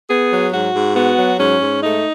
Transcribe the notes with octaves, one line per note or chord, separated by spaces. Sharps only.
B3 G#4
F#3
G#2 F#4
G#2
B3 F#4
F#3
G#2 C#4
G#2
A3 D#4